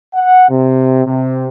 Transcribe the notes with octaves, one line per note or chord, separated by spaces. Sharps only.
F#5
C3
C3